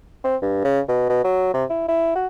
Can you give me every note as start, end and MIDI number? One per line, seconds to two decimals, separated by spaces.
0.24 0.36 60
0.42 0.60 43
0.64 0.80 49
0.88 1.06 47
1.09 1.23 47
1.24 1.53 54
1.54 1.65 48
1.70 1.87 64
1.88 2.11 64
2.16 2.27 66